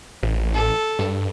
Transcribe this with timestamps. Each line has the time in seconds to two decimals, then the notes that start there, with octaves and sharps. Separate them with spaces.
0.23 A1
0.54 A4
0.99 G2